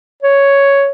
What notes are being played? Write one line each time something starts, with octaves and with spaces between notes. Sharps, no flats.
C#5